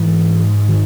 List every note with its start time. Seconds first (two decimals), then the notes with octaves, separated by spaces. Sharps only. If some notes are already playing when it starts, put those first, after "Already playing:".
Already playing: G#2 E3
0.69 D#3